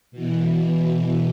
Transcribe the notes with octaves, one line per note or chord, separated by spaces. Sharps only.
B2 E3